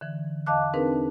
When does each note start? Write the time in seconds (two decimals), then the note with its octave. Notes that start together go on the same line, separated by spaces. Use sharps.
0.01 D3 E3
0.46 E2 D#5 F5 A5 D6 F#6
0.74 C4 D4 D#4 G#4 A#4 B4